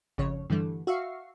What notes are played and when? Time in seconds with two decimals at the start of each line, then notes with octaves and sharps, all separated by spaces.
0.18 G#1 F2 C#3 C#5
0.50 G2 D3 E3 G3 A3
0.87 F#4 E5 F5 C#6 C7